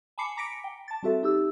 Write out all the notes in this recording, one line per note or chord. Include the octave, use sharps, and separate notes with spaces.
G#5 A5 B5 D6 C7 C#7
A#5 D6 A#6 B6 C#7 D7
G5
A5 A6
G3 C4 F#4 A4 E5
D#4 G4 E6